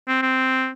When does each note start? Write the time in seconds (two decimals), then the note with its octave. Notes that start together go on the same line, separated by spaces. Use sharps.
0.08 C4
0.22 C4